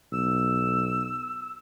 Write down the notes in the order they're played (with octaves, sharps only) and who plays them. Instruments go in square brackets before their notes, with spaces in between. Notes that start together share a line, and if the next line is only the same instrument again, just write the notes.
[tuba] B1 [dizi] E6